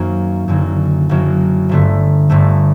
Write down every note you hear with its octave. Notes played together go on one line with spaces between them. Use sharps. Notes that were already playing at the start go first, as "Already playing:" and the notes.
Already playing: F#2 D#3 F#3 A#3 C4
F#1 F#2 D3 F#3
F#1 F#2 F#3
G1 G2 D3 A3
G1 G2 D3 A3